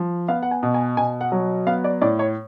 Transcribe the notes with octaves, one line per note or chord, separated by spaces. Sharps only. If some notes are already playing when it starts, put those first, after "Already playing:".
Already playing: F3
B3 F5
F#5
G#5
B2
G#5
B2 G#5
F#5
F#3
B3 F5
D5
A2 D5
C#5